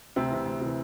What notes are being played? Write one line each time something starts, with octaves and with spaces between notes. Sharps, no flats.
D2 C3 C4
C3 E3
D2
C3 E3